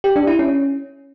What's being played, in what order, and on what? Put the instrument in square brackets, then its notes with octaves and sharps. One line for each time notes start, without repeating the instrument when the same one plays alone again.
[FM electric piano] G4
D4
E4
C#4